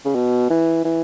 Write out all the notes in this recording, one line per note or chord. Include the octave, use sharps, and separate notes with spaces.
C#3
B2
E3
E3